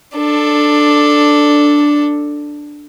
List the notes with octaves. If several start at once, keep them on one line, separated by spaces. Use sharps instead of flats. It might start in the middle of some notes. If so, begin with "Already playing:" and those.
D4 A4